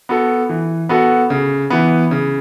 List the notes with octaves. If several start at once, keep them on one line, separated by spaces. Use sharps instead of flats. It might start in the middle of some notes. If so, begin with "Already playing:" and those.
B3 F#4 A4
E3
B3 F#4 A4
C#3
E3 B3
C#3